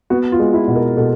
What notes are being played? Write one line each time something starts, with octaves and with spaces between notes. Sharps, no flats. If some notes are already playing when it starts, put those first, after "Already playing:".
B3 F#4
F4
G#3
E4
B2
A#4
B2 A4